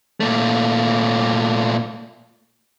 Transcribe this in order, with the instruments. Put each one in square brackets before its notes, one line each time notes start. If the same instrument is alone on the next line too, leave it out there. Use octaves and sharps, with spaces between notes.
[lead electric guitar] A#2 A3